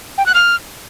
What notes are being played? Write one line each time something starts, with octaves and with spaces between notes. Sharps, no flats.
G5
F#6
F6